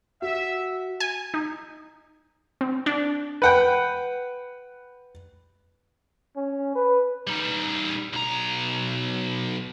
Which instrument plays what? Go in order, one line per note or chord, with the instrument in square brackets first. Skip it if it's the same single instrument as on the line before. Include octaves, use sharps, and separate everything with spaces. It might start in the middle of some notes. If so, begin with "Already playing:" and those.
[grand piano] F#4 [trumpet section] E5
[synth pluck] G#5
D#4
C4
D4
[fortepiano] B4 F#5 G5
[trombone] C#4
B4
[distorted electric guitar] G3 D#4
B1 A#5